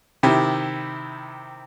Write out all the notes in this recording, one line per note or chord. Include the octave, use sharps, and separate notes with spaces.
C3 D#3 E4 G4